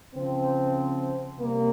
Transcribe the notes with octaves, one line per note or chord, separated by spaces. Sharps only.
C#3 F3 C4
C3 G3 A#3